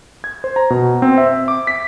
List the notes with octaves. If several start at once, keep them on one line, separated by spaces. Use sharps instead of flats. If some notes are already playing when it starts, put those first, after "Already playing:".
G#6
C5
A#5
B2
C4
E5
D6
B6